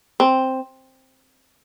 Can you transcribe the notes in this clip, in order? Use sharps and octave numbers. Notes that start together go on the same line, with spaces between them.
C4